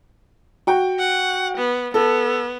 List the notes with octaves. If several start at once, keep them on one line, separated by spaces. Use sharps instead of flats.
F#4 G5
F#5
B3
B3 A4